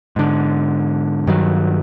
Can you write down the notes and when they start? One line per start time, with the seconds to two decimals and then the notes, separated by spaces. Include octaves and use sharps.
0.16 G#2 D3
1.27 G2 D#3 F#3